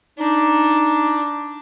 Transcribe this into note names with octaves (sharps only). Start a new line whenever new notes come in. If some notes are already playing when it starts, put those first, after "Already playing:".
D4 D#4